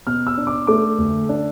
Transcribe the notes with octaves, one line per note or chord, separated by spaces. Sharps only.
B2 F6
E6
D4
D6
A3 D6
D2
D4